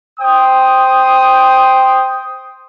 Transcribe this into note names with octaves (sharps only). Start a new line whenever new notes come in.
C5 G5 D#6